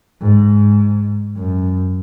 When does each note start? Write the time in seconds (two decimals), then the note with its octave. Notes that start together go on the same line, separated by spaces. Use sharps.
0.21 G#2
1.37 F#2